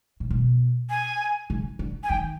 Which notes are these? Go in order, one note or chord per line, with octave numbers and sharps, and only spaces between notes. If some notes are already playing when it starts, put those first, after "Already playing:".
A#2
B2
G#5
C#3
D3
G#5
D#3 G5